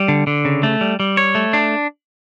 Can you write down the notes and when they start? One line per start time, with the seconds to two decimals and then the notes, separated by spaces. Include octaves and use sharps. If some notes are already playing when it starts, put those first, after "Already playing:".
Already playing: G3
0.08 D3
0.27 D3
0.45 C#3
0.63 A3
0.81 G3
1.00 G3
1.17 C#5
1.35 A3
1.53 D4